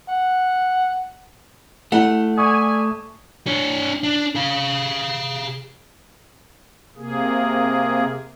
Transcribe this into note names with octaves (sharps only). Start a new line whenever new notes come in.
F#5
A3 E4 F#5
D5 E5 G#5 C#6 D#6
D4 C#5
D4
G#4 F5
C3 A#3 G#4